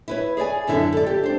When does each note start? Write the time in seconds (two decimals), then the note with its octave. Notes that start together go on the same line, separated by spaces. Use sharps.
0.08 E4 B4 C#5
0.37 G#4 C#5 D5 G#5
0.67 F#2 D3 E4 E5
0.93 A4 D5
1.06 G4
1.23 D4 C5